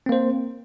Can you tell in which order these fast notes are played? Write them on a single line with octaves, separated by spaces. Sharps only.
C4 A#3 C5